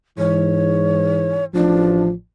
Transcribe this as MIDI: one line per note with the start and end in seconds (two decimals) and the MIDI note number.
0.18 1.47 44
0.18 1.47 52
0.18 1.44 73
1.54 2.10 33
1.54 2.11 53
1.54 2.05 62